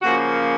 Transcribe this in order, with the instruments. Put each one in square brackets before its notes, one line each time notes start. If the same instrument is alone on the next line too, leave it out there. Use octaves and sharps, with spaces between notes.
[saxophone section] C#3 F3 A#3 C#4 F#4